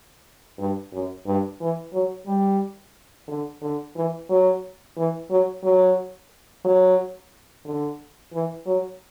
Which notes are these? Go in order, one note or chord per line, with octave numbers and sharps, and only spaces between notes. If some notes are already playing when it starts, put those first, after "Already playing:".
G2
F#2
G2
E3
F#3
G3
D3
D3
E3
F#3
E3
F#3
F#3
F#3
D3
E3
F#3